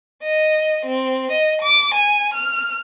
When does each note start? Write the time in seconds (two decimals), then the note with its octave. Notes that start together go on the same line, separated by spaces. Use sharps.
0.23 D#5
0.86 C4
1.32 D#5
1.62 D6
1.94 G#5
2.34 F6